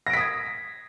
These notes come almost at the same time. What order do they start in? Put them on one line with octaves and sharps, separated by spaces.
A#6 D7 B6 D#6 G#6